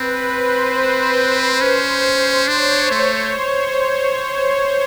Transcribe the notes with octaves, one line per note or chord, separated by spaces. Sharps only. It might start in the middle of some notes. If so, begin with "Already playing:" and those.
Already playing: C4 B4
C5
C#4
D4 C#5
A3 C5